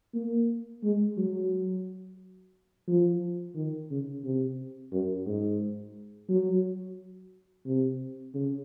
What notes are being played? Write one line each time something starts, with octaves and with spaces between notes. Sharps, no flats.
A#3
G#3
F#3
F3
D#3
C#3
C3
F#2
G#2
F#3
C3
C#3